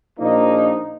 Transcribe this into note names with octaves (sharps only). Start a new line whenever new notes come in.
A#1 A#2 F3 A#3 D#4